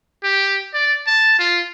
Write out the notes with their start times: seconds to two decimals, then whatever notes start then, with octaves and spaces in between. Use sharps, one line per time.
0.24 G4
0.74 D5
1.07 A5
1.39 F4